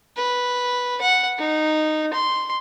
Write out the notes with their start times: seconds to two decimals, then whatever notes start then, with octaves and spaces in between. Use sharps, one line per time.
0.17 B4
1.02 F#5
1.39 D#4
2.13 C6